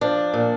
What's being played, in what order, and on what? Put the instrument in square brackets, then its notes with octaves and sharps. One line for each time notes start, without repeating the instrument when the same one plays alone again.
[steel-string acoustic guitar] F3 D4
A#2